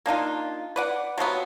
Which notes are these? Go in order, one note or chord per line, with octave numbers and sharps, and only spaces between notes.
A#3 D4 D#4 F4
B4 D5 F#5
C3 F3 F#3 B3